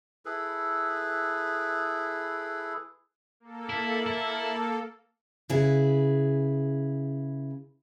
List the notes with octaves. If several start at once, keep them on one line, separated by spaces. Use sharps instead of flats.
E4 G#4 A4 B4
A#3 A4
E4
E4
C#3 E4 G#4 B4